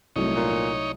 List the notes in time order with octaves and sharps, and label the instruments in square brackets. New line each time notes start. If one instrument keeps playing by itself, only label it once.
[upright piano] C2 F#3 A3 [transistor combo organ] D#4 C#5
[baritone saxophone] A#2